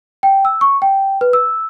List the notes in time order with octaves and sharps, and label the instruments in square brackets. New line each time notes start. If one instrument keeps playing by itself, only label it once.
[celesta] G5
E6
C#6
G5
B4
E6